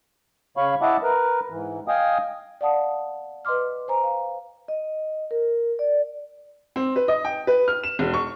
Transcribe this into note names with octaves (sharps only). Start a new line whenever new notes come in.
C#3 C#5 F5 B5 C#6
E4 D#5 E5 F#5 A5 D6
A#4 B4
G#2 E3
D#5 F5 G5 G#5 D#6
D5 F5 F#5 A5 D#6
B4 D#5 C6 D6 F6
C5 G#5 A#5
F5
D#5
A#4
D5
C4
B4
D#5
G5
B4
F6
E7
E1
C#6